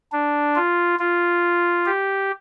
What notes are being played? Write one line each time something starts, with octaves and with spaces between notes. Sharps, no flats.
D4
F4
F4
G4